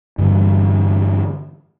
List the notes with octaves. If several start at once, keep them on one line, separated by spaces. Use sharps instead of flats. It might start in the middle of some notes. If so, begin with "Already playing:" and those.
G2 D3 E3 G3